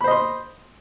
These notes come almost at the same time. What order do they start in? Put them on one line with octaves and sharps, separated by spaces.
B5 C5 D#5 C6